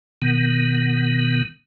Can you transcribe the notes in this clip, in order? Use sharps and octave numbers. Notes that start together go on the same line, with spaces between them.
B2 D#3 B3